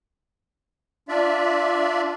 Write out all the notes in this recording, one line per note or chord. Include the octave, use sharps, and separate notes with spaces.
D4 F4 D5 E5